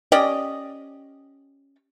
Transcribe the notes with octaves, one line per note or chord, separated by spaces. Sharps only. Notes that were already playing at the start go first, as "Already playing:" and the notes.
C#4 G4 D5 D#5